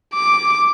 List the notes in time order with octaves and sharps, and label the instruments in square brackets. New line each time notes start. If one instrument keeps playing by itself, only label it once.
[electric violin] D6